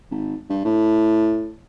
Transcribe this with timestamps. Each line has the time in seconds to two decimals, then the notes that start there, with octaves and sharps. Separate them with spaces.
0.11 G#1
0.50 G2
0.65 A2